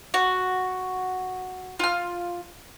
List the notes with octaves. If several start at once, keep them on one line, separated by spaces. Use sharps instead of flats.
F#4
F4 F6